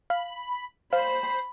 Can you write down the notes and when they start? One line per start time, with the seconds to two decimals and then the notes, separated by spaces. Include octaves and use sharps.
0.10 F5 B5
0.93 C5 F5 B5